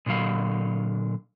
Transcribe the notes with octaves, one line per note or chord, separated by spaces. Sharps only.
A#2 D3 F#3 F5